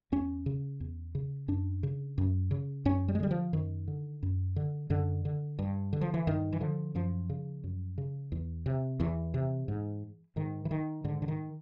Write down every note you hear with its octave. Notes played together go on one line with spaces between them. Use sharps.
E2 C#4
C#3
E2
C#3
F#2 D4
C#3
F#2
C#3
F#2 C#4
G3
G#3
D3 G3
F3
F#2 D#3
D3
F#2
D3
F#2 D3
D3
G2
D3
F3
E3
G2 D#3
E3
D3 F3
F#2 F3
C#3
F#2
C#3
E2
C3
E2 E3
C3
G#2
G#2 D#3
E3
D#3
G#2 D3
D3
D#3